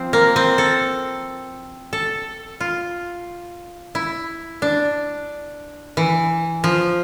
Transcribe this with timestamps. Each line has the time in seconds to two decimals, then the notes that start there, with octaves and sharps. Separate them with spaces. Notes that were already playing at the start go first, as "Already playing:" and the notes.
Already playing: F3 C4
0.13 A#3
0.36 C4
0.58 A4
1.93 A4
2.60 F4
3.95 E4
4.62 D4
5.97 E3
6.64 F3